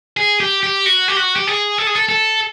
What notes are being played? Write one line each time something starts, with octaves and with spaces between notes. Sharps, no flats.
G#4
G4
G4
F#4
G4
F#4
G4
G#4
A4
G#4
A4
A4